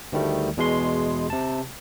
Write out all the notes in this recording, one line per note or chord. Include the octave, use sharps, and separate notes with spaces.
D2 D#3 G3 A3
E2 B2 G#3 C6
C3 A5